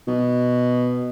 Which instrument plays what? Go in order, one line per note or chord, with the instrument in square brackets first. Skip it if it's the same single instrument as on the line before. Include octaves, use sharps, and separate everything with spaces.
[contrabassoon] B2